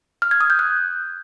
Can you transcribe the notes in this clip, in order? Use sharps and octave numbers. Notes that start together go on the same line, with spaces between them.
F6
G#6
D#6
G6
F#6